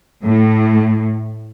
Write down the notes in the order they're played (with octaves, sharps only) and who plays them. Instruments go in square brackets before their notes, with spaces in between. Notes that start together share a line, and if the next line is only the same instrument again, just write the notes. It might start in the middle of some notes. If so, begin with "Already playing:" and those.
[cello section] A2